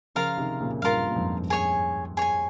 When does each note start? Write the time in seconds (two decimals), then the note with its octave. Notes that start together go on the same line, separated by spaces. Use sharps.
0.15 C#3 F3 F4 A#4 F5
0.38 C3 D#3
0.61 A#2 C#3
0.82 G2 A#2 F4 A#4 F5
1.08 A#2
1.16 F2 G#2
1.50 G#4 C#5 G#5
2.17 G#4 C#5 G#5